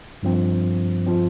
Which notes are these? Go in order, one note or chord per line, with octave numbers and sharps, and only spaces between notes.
G2 F3 C4
F3 C4